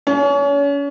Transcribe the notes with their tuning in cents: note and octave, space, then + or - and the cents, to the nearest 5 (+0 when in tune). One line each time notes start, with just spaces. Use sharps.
C#4 +35